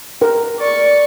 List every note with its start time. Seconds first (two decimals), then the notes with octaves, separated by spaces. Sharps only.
0.21 A#4 G5
0.60 D5 C#6